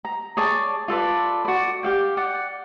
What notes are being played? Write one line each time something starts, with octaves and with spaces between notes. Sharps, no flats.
A#5
G#4 C#5 D5 A5
F4 A4 B4 D5
F#4 D5
G4 F5 G5
D5 F#5